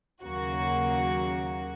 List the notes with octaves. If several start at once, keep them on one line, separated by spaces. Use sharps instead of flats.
D#2 C#3 F#3 A#3 F#4